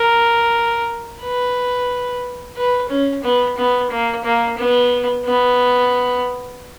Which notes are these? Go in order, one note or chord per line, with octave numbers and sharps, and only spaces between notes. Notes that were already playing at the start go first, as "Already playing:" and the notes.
Already playing: A#4
B4
B4
C#4
B3
B3
A#3
A#3
B3
B3